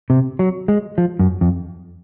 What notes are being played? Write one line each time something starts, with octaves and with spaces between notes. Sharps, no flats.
C3
F#3
G#3
F3
F#2
F2